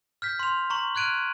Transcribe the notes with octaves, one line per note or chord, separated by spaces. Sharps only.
F6 G6 B6
C6 F7
A#5 C#6 F#7
F6 F#6 G#6 D7 D#7 F7